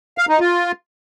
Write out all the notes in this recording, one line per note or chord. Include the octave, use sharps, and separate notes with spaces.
F5
D#4
F4